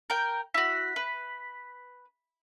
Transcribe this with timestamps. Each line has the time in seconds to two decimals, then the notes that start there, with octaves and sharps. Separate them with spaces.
0.10 A#4 G5
0.54 E4 F#4 B6
0.96 B4